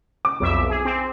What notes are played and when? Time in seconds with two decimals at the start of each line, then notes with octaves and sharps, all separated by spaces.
0.25 D6
0.40 B1 F2 E5
0.70 G#4
0.85 C4